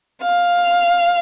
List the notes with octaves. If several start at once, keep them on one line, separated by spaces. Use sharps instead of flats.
F5